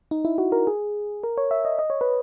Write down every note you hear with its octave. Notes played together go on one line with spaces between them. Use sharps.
D#4
E4
F#4
A#4
G#4
A#4
C#5
E5
D#5
D#5
C#5
B4